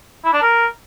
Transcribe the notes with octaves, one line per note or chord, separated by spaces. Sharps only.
E4
D4
A#4